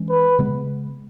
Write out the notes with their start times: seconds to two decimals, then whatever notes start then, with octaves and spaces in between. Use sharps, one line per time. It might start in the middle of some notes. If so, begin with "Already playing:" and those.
Already playing: E3 G#3 C#4
0.09 B4
0.39 C#3 G#3 B3